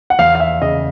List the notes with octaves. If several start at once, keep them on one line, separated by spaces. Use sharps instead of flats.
F#5
E2 F5
F5
E5
C#3 D#5